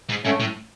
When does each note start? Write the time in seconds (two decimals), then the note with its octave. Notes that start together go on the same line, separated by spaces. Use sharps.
0.09 G#2
0.24 G#2 A3 C#4
0.40 A2